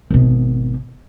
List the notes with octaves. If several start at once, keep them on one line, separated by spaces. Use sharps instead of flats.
G#1 B2